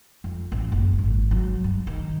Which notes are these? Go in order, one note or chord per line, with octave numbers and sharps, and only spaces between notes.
F2
A1
F#1
G#1
F#3
G2
D#3